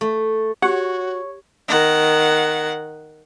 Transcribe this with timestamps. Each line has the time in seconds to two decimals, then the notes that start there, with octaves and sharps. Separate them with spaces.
0.01 A3
0.62 F#4 G4 C#5 F#5
1.68 D#3 F#5